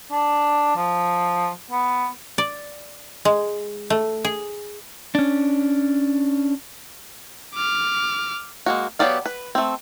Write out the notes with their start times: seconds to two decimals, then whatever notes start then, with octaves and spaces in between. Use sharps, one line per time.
0.11 D4
0.77 F3
1.71 B3
2.38 D5
3.25 G#3
3.90 A3
4.25 G#4
5.15 C#4 D4
7.55 D6 F6
8.66 G#3 A#3 F#4
8.99 F#3 B3 G4 D5 F5
9.26 B4
9.55 A3 C4